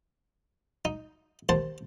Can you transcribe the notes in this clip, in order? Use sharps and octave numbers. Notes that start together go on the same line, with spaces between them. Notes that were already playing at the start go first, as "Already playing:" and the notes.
D#4
D#2 C5 A5